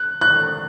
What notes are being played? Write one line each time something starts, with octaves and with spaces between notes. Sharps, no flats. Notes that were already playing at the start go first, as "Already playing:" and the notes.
Already playing: F#6
F#6